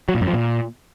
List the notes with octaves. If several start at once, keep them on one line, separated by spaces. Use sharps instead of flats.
F#3
A#2
F#2
F3
A#2